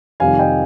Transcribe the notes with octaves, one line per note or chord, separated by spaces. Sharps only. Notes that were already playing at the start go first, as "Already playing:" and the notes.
F2 C3 D#3 G3 F5 G#5
D#5 G5